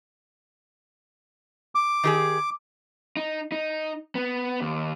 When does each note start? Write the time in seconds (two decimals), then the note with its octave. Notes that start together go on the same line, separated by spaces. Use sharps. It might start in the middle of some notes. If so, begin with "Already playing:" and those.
1.75 D6
2.03 D#3 G4 G#4
3.17 D#4
3.52 D#4
4.15 B3
4.60 D#2